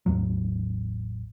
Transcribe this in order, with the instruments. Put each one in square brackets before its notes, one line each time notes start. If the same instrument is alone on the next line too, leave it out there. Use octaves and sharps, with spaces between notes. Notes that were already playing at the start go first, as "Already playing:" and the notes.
[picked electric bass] A1 E2 F#3